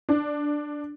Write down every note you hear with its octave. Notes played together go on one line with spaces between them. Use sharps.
D4